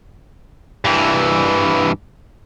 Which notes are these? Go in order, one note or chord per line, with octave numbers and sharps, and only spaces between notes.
G2 E3